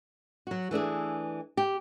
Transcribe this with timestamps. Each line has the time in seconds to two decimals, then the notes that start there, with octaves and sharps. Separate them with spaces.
0.47 F#3 F#4
0.71 E3 A3 D4 G#4
1.57 G4